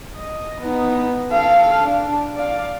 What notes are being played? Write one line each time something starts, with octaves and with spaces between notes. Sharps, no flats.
D#5
B3 D#4
A4 F5
D4
D5 F5